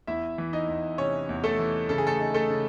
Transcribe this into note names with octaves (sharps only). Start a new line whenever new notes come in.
E2 E4 E5
E3
D#4 D#5
E2
C3 C#4 C#5
E2
A3 A4
E3
C#3 A4
G#4
A3 A4
D#4
A3 A4
C#3